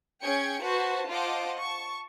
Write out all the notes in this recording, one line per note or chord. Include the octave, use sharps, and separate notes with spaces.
C#4 G#4 G5 G#6 C#7
F#4 B4 C5 A5
F4 C5 D#5 F#5 A5 D6
A5 C#6